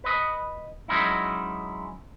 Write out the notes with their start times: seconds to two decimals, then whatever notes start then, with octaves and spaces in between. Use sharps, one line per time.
0.04 B4 D#5
0.88 F#3 G#3 C#4 D#4 E4